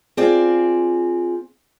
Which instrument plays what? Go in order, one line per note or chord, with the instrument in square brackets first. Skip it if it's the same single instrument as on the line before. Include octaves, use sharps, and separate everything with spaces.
[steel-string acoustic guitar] C4 F4 G#4 D5